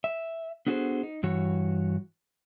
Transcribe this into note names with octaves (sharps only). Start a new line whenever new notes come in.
E5
B3 D4 F#4 G#4 A4 C5
D#4
G2 E3 F#4 C#5